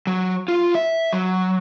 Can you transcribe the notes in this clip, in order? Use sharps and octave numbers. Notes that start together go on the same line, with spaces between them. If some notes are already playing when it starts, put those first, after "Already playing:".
F#3
F4
E5
F#3